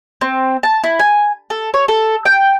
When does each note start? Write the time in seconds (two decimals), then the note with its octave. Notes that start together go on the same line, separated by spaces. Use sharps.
0.21 C4
0.63 A5
0.84 E4
0.99 G#5
1.50 A4
1.74 C#5
1.88 A4
2.25 G5